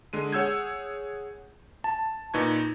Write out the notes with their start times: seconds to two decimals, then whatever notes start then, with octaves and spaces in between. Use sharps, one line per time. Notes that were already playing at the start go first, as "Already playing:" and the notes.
0.13 D3 G#3 D#7
0.33 G#4 C#5 F#5 E6 G6 G#6
1.84 A5
2.34 A#2 D#4 B4 C#6 G#6